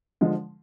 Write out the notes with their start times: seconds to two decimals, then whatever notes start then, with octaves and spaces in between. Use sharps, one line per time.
0.21 D3 F3 G#3